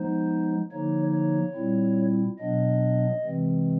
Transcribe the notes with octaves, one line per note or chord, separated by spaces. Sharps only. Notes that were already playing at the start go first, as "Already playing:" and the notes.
Already playing: F3 G#3 B3 D#4 C5
D3 F3 A#3 D#4 C#5
C#5
A#2 G3 C4 E4
B2 F#3 B3 D4 D#5
C3 E3 G#3 C4